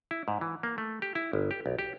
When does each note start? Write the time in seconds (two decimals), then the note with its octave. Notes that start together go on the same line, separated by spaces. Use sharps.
0.11 E4
0.28 G#2
0.41 E3
0.63 A#3
0.78 A3
1.02 G4
1.15 E4
1.33 G1
1.51 G4
1.66 B1
1.79 G4